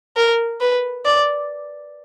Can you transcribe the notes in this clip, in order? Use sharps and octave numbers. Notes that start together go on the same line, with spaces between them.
A#4
B4
D5